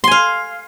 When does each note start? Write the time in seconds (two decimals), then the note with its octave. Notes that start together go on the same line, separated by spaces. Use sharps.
0.04 C6
0.08 G#5
0.11 F5